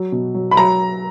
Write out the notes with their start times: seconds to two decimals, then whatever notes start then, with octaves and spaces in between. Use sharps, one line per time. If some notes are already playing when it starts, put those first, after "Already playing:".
Already playing: F#3
0.12 B2
0.34 F#3
0.51 B5
0.57 F#3 A#5